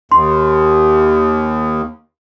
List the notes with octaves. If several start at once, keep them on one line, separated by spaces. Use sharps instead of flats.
D#2 C6